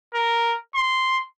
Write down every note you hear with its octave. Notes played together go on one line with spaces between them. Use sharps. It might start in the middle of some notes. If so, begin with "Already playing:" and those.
A#4
C6